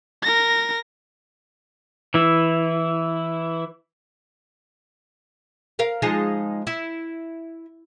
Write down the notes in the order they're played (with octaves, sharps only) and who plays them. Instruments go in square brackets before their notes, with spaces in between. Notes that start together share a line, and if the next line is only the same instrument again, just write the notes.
[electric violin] A#4 A#6
[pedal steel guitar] E3 E4
[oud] A#4 F5
F3 G#3 D#4
E4